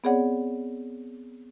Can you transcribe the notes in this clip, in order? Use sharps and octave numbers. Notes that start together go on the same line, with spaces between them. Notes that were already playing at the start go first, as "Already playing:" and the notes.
B3 C4 G#4 C#5 D5 F#5